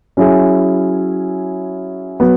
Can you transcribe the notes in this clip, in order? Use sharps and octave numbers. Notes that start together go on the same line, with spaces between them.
F#3 C#4 E4 G#4
F#3 B3